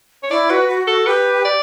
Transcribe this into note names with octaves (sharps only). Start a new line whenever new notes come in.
C#5
E4 D5
F#4 B4
F#4
F#4 A4
G4 B4
D5